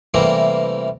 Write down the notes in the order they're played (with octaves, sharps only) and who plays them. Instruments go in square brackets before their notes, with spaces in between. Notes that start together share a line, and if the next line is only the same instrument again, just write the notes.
[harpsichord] C3 E3 G3 A3 A#3 A#4